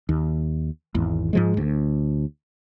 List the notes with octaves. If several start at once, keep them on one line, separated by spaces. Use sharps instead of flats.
D#2
G#1 E2
G#2 F3 G#3
D2